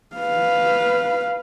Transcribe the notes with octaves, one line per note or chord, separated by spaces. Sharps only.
B4 F5